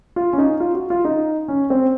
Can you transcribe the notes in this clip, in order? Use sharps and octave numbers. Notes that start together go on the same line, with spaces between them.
F4
C#4
D#4
F4
F#4
F4
D#4
C#4
C4